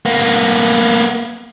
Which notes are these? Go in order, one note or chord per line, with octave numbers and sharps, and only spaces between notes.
A#3 B3